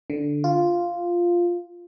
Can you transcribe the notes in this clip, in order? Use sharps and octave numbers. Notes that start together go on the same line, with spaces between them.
D3
F4